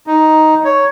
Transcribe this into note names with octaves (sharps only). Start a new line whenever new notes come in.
D#4
C#5